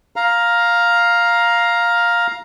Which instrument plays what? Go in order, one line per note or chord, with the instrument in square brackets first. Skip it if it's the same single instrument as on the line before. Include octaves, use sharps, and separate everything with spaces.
[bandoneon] F5 A#5